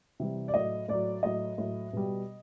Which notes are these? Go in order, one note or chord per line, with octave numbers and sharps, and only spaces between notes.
C3 E3 G3
D5
A2 F#3 D#5
A2 F#3 D5
A2 F#3 D#5
A2 F#3
B2 G3